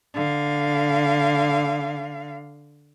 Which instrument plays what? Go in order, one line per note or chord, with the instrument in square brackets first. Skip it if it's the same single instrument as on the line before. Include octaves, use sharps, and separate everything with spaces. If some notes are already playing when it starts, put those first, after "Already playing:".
[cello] D3 F5